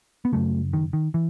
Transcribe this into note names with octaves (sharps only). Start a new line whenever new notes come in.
B3
F#2 C#3 F#3 A3
D#3
D#3
E3